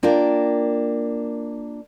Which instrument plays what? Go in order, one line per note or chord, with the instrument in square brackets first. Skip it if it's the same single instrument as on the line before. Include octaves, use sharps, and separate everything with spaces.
[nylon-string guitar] A#3 D4 F4 A#4 G5